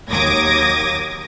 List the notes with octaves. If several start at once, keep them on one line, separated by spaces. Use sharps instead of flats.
D#2 F#3 D6 D#6 G#6 A#6